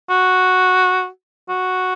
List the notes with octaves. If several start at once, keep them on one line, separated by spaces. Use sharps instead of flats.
F#4
F#4